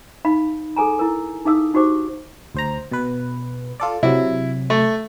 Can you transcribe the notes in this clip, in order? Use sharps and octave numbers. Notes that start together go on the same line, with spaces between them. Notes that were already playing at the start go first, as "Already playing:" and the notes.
D#4 F5 B5
G#4 A4 G#5 A#5
E4 A#4
D#4 G#4 F5 D#6 E6
D#4 F#4 G4 C5 D6
D2 C5 A#5
B2 B4
F4 A4 D5
C3 F#3 E4
A3